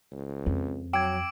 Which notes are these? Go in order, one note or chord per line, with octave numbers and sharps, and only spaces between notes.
C#2
F2
F#3 G5 D6 E6 G#6 D7